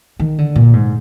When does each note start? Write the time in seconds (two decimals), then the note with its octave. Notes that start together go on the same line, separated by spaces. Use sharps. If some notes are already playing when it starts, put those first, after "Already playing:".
0.19 D#3
0.38 D3
0.56 A#2
0.73 G#2